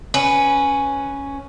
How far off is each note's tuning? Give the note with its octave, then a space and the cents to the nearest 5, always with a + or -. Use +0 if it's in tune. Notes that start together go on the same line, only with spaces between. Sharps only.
C#4 +0 B4 +0